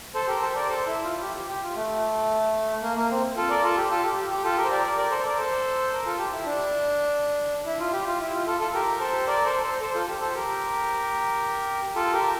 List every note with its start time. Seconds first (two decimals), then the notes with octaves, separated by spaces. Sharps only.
0.14 A4 C5
0.27 G4 A#4
0.41 A4 C5
0.55 A#4 D5
0.68 A4 C5
0.87 E4
1.04 F4
1.21 G4
1.36 G4
1.48 G4
1.63 F4
1.76 A3
2.82 A#3
2.97 A#3
3.10 C4
3.37 F4 A4
3.50 A#4 D5
3.64 F4 A4
3.76 G4
3.91 F4 A4
4.04 G4
4.17 G4
4.30 G4
4.44 F4 A4
4.57 G4 A#4
4.64 C5
4.71 A#4 D5
4.84 A#4 D5
4.97 A#4 D5
5.11 A4 C5
5.25 A#4 D5
5.37 A4 C5
5.94 A#4
6.05 F4 A4
6.18 G4
6.32 E4
6.45 D4
7.66 E4
7.80 F4
7.93 G4
8.06 F4
8.20 E4
8.33 F4
8.47 F4 A4
8.60 F4 A4
8.73 G4 A#4
9.00 A4 C5
9.27 A#4 D5
9.45 A4 C5
9.63 A4 C5
9.81 A4 C5
9.94 F4 A4
10.08 G4
10.21 A4 C5
10.34 G4 A#4
11.95 F4 A4
12.13 G4 A#4